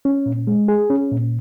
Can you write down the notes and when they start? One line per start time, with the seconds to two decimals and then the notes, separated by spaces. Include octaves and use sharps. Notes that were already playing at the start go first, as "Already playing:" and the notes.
0.05 C#4
0.26 A#2
0.47 G#3
0.68 G#4
0.90 C#4
1.12 A#2